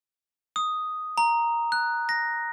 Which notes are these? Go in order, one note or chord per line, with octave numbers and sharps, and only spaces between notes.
D#6
A#5
F#6
A#6